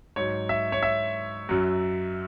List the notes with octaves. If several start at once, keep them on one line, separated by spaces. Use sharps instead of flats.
G#2 F#3 C#5
E5
C#5
E5
F#2 F#3